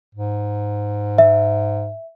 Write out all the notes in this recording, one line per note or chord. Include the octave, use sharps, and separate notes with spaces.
G#2
E5